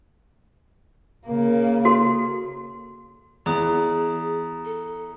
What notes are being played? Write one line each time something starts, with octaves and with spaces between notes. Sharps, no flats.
C#3 A#3
F#4 A4 C6
E2 G#4 A#5 D#6
A4